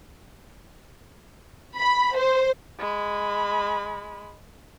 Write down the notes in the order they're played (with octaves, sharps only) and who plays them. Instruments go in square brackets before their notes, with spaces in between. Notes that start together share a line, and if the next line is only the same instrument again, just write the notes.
[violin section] B5
C5
[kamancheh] G#3 B5